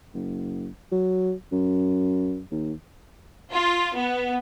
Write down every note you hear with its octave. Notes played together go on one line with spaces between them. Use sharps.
F#1
F#3
F#2
D#2
F4
B3